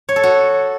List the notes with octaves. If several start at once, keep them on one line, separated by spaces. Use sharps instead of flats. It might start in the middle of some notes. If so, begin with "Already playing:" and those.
C#5
A4
F#4